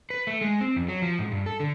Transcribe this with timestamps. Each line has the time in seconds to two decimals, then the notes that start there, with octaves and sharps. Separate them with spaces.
0.10 B4
0.27 A3
0.41 G#3
0.61 C4
0.76 F2
0.88 F#3
1.02 F3
1.19 G#2
1.32 G2
1.46 A4
1.60 D3